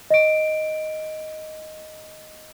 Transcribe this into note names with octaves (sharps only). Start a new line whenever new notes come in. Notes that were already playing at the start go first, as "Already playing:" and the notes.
D#5 D7